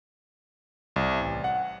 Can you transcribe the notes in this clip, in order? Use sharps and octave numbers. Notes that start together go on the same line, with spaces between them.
C2
A1
F#5